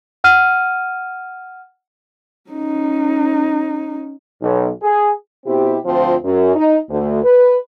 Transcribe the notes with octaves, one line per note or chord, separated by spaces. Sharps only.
F#5 F6 D#7
C#4 D#4
B1
G#4
B2 C4 E4 G4
D2 F3 C4 F4
F#2
D#4
D2
B4